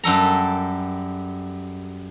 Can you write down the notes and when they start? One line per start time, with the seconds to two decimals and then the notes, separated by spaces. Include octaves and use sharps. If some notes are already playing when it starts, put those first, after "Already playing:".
0.04 F#2 G3 A4 A#5